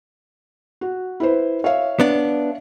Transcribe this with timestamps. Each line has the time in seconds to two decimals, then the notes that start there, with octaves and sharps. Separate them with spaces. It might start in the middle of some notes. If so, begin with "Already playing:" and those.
0.81 F#4
1.20 E4 B4 C5
1.64 C#5 E5 F5
2.00 B3 D4